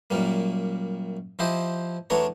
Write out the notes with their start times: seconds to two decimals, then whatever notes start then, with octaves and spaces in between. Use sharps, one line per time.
0.10 F#2 A#2 G3 A#3
1.39 F3 E4 G4 C5 D#5
2.10 E2 A3 B3 D4 C#5 A#5